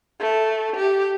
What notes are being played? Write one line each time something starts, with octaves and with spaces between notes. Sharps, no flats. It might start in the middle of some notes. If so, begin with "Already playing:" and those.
A3
G4